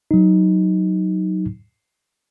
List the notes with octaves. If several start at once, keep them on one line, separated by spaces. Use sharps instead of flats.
F#3 D#4